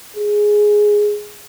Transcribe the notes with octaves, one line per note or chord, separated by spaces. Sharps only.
G#4